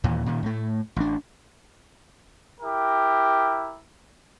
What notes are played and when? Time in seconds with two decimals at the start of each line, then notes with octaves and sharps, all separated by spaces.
0.04 D#2 A#2 E3
0.26 A#2 D#3
0.43 A2 A3
0.96 A1 D4
2.61 E4 G4 A#4